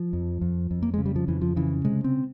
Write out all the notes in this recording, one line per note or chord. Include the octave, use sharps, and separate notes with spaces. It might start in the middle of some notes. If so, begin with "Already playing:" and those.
Already playing: F3
F2
F2
F2
A#3
C#3 G#3
G3
F3
F2 E3
F3
C#3 E3
C3 G#3
C4